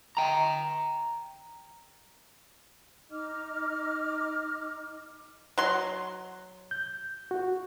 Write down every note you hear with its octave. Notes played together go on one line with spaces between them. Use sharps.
G5 A#5
D#4 D#5 D6 F6
F#3 C6
G6
F#4